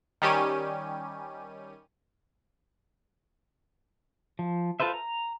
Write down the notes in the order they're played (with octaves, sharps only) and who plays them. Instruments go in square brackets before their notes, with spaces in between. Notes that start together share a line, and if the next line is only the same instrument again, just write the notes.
[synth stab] D#3 G3 C#4 G4 D#7
[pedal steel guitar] F3
F4 A4 B4 C5 E5
A#5